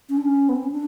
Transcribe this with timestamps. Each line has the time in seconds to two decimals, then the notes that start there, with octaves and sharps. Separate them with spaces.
0.09 C#4
0.18 D4
0.25 C#4
0.49 B3
0.56 C4
0.64 C#4
0.72 D4